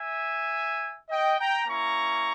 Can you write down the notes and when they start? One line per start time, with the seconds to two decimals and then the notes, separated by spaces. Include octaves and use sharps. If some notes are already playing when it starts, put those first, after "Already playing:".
Already playing: E5 G#5
1.09 D#5 G5
1.38 G5 A#5
1.67 A#3 C#4 E4 A#5 C#6